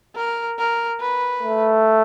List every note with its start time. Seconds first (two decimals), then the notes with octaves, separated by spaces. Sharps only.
0.15 A#4
0.58 A#4
1.00 B4
1.43 A3